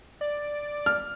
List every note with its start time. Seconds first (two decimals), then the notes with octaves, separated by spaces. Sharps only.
0.21 D5
0.86 F6